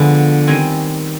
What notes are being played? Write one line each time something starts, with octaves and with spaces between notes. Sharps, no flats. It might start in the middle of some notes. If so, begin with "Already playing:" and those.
Already playing: D3 F3 G#3 B3
D#3 G3 C4 G#5